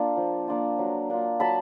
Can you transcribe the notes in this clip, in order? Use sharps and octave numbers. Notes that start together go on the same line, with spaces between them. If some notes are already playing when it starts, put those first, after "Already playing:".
Already playing: A#3 D4 F4
F3
A#3 D4 F4
F#3
A#3 D4 F4
F#3 A5 B5